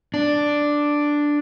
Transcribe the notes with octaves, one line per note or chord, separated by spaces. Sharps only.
D4